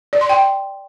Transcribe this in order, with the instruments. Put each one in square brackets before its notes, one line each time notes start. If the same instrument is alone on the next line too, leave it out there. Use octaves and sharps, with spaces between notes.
[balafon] D5
C6
G5